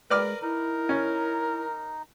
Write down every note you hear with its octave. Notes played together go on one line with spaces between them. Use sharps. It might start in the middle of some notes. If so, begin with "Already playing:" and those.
G#3 A#4 B4 D5 F6
D#4 E4 A#4
C#4